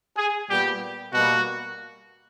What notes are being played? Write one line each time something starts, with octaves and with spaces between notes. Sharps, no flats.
G#4
A#2 G3 B3 G4
B2 G3 A#3 F#4